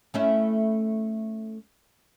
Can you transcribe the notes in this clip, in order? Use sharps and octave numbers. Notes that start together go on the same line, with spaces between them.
A3 C#4 E4